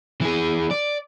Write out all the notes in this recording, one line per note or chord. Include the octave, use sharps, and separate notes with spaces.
E3 G#4
D5